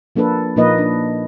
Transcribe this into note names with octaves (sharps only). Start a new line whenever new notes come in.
F3 A#3 D4 A4 B4
A#2 F3 A#3 D#4 B4 D#5
D4